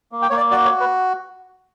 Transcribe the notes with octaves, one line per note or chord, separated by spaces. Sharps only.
A#3
G5
A#3 C#5
D5
F#4 D5
C#5
F#4
B4